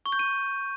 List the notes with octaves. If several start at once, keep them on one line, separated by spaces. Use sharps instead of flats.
C#6
G6
D#7